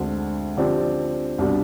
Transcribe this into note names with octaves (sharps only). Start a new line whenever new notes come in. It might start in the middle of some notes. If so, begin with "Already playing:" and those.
Already playing: D2 D3 G#3 C4
D3 F3 C4 G4 D5
C2 B2 G3 D4